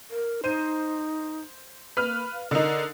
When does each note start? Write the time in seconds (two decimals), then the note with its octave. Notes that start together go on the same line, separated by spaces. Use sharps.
0.11 A#4
0.44 D#4 C5 D#7
1.97 A#3 B4 F6
2.33 F5
2.51 D3 D#4 A#4